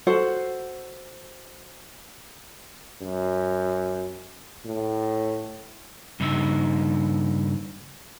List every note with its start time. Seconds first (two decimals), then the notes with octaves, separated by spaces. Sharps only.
0.07 F#4 A4 C5 F#5
3.02 F#2
4.66 A2
6.20 G2 C#3 D#4 E5